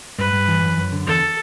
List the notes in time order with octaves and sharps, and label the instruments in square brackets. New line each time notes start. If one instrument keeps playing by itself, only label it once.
[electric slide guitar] G2 [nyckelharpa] B4
[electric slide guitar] G2
E3
F#2
F#2
D3
[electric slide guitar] E2 [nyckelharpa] A4